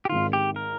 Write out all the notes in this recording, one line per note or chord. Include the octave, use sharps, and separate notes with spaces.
G4
G#1 G#2 D#3 F4
G4
A#4